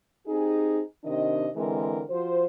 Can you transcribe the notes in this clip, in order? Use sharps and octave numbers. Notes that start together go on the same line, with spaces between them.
C4 D#4 G4 G#4
C3 D#3 D4 D#5
D3 E3 G#3 C4 A#4
F3 F#4 C5